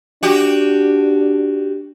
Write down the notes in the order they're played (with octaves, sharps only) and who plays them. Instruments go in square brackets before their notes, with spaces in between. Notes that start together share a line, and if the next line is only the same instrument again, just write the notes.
[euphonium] D4 [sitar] F#4 G4